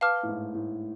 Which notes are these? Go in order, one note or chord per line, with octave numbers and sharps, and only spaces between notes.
B4 F5 A5 D6 F6
A2
G#2
A2